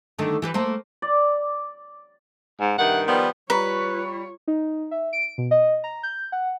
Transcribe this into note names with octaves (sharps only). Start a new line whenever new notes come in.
D3 D#3 A3
E3 G4 B4
A3 A#3 C5
D5
G#2
G2 C3 D#3 F#5
F3 G3 B3
G3 F4 B4 C#5 A#5 B5 C#6
D#4
E5
D7
B2
D#5
A#5
G6
F#5